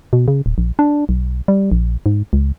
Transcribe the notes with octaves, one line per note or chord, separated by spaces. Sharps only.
B2
C#3
D1
A#1
D4
B1
G3
A#1
G#2
C#2